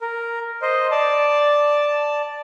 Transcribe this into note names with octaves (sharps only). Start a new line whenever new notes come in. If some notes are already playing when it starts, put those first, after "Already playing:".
A#4
C5 D#5
D5 A5